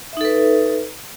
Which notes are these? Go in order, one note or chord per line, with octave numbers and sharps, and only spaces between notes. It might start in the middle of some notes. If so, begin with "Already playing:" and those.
D#4 A4 B4 E5